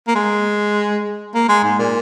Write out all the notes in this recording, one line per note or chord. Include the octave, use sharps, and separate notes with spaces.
A#3
G#3
A#3
G#3
G#2
A#2